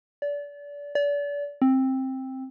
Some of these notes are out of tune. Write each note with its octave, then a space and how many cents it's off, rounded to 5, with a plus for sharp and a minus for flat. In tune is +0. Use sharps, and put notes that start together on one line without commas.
D5 -30
D5 -35
C4 +10